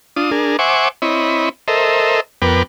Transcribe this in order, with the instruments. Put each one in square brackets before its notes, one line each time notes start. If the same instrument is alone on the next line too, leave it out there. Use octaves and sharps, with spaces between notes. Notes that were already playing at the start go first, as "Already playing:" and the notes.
[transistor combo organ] D4 F4 D#6
D4 G#4 A#4
C5 E5 F#5 G#5 C#6 D6
C4 E4 C#5 D#5 B5
A4 A#4 C5 D#5 E5
F2 B3 A#4 B4 G5 D6